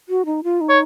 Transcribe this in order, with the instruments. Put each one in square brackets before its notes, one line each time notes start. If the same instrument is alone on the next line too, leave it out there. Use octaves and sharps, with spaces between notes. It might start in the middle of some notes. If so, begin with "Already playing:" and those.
[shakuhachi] F#4
D#4
F4
D#4
[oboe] C#5